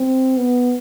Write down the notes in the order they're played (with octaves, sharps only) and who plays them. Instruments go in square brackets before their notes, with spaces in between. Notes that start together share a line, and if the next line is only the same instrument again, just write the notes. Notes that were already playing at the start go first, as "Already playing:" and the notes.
Already playing: [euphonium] C4
B3